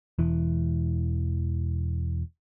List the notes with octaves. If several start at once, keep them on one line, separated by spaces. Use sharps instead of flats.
E1 E3